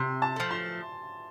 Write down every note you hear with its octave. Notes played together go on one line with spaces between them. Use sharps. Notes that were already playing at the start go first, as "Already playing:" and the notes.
Already playing: C3 C6
A5
F3 A3
C6